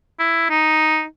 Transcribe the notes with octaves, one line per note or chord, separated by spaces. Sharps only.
E4
D#4